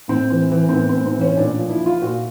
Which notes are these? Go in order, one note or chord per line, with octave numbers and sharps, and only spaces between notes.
A2 C4
E3
E3
C4
A2 B3
C4
A2
C4
E3
C#4
A#2 D4
F3
E4
F3
F4
A#2 F#4